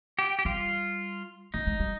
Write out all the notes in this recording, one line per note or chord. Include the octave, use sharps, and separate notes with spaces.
G4
G4
G3 F4
A#3 D#4
G#3
G3